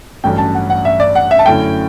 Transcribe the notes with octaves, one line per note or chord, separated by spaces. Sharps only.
A1 G2 F#3 A3 C#4 G5
A5
F#5
F#5
E5
D5
F#5
E5
A5
F#2 D3 A3 C#4 E4 G5